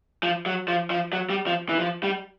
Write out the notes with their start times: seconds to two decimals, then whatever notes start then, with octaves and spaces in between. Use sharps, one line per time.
0.23 F3
0.46 F#3
0.68 F3
0.90 F3
1.13 F#3
1.30 G3
1.47 F3
1.69 E3
1.80 F3
2.03 G3